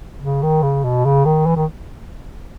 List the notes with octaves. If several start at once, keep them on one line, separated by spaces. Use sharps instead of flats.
C#3
D#3
C#3
B2
C#3
D#3
E3
D#3